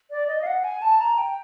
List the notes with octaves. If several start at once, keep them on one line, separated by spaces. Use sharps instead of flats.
D5
D#5
F5
F#5
G#5
A5
A#5
G5